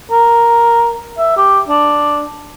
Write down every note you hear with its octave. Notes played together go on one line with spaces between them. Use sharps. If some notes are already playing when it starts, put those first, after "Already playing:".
A#4
E5
G4
D4